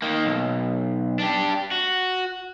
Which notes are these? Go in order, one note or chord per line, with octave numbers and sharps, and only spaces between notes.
D#3 A#3
B1
D4 G4
F#4